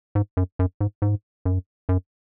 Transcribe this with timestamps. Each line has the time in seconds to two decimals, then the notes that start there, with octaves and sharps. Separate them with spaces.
0.15 G#2
0.37 F#2
0.59 F#2
0.81 G#2
1.02 G#2
1.45 F#2
1.89 F#2